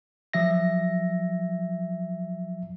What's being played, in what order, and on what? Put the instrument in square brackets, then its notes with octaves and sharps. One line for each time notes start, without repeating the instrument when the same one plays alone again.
[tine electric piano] F3 F#3 E5 A#6